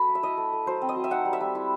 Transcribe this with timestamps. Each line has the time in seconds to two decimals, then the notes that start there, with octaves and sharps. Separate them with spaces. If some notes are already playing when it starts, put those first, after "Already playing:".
Already playing: F#3 A4 B5
0.09 A3
0.15 E5
0.23 E4 D#5
0.37 A3
0.53 A3
0.66 F#3 C5
0.82 C4
0.89 D#5
0.96 F#3
1.04 E5
1.11 D#4 F#5
1.25 G3
1.33 E5
1.41 G3
1.55 E4